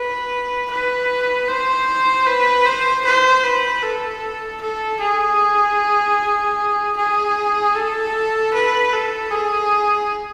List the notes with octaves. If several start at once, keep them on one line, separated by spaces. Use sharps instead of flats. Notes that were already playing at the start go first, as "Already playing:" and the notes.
Already playing: B4
B4
C5
B4
C5
C5
B4
A4
A4
G#4
G#4
A4
B4
A4
G#4